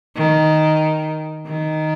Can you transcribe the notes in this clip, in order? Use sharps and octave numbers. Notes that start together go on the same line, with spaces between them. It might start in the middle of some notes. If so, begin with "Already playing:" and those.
D#3
D#3